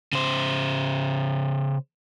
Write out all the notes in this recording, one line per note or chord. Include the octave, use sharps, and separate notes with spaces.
C#3 C5